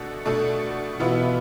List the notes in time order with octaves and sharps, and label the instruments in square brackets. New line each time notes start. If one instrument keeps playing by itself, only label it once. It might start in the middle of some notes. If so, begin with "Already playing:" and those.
Already playing: [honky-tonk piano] B2 A3 D4 A4
B2 A3 D4 A4
[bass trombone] B2 [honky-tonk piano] E3 B3 F4 B4 E5